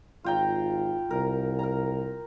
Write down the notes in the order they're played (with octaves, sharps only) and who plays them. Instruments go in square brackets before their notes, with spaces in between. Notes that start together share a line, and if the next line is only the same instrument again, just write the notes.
[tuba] G#1 [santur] F4 G5 A#5
[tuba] C2 [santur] A#4
[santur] A#4 A#5